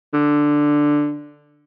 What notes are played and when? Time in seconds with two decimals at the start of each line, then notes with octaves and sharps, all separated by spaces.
0.14 D3